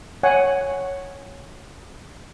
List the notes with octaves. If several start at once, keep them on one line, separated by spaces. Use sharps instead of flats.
C#5 F#5 G#5